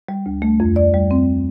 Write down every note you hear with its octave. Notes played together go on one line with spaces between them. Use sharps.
G3
D2
A3
F2
D5
G3
C4